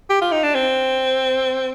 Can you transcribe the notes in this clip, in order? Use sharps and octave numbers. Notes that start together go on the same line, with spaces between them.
G4
F4
D#4
D4
C4